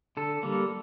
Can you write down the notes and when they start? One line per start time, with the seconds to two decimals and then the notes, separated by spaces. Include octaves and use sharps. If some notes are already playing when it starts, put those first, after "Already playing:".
0.17 D3 A4
0.43 G3 A#3